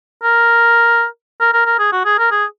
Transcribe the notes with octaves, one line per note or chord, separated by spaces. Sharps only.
A#4
A#4
A#4
A#4
G#4
F#4
G#4
A#4
G#4